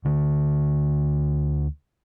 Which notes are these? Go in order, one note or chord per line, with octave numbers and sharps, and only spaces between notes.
D2 D3